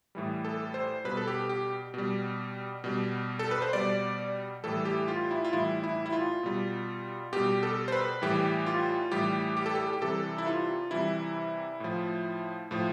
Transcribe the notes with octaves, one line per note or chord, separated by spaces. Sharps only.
A2 E3 G3
A4
C5
B2 G3 B4
A4
G4
G4
B2 G3
B2 G3
A4
B4
C5
B2 G3 D5
A2 E3 G3 A4
G4
F4
E4
F4
A2 E3 G3 E4
E4
E4
F4
B2 G3
B2 G3 G4
A4
C5
B4
A2 E3 G3 G4
F4
A2 E3 G3 G4
G4
A4
G4
G4
C3 E3 G3 A4
E4
F4
C3 E3 G3 E4
A2 F3
A2 F3